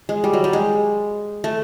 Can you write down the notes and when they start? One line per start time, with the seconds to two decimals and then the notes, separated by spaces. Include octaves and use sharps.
0.09 G#3
0.24 G3
0.33 F#3
0.44 G3
0.53 G#3
1.44 A3